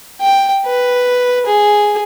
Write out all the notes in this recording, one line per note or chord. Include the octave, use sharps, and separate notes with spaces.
G5
B4
G#4